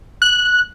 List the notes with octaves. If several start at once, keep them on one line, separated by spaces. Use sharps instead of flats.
F#6